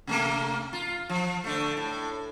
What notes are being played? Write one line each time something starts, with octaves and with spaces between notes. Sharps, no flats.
C3 A3 A#3
F4
F3
D3 A3
A2